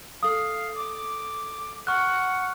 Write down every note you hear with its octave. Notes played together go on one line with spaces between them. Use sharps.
A4 F5 D#6
D6
F#5 C#6 F6 F#6